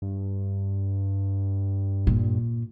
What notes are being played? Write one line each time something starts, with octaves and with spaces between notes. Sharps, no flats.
G2
A#2